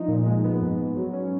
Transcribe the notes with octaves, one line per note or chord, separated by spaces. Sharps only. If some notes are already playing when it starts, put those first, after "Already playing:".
Already playing: F3 D#4
A#2
G#3
B3
G#2
G#2
F#3
C#4